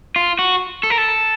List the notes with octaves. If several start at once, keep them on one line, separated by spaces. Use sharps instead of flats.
F4
F#4
A4
A#4
A4